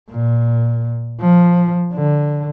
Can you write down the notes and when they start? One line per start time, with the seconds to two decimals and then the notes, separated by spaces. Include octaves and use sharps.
0.11 A#2
1.21 F3
1.93 D3